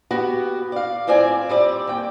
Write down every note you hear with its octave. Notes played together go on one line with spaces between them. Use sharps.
B3 F#4 G4
D5 F5
A2 C4 F4 D5 G#5
G3 C4 D5
D#2 G5